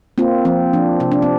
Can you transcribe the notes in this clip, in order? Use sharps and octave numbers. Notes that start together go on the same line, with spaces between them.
A#3 C4 F4
F3 C4
F3 D4
C3 F4
D4
C4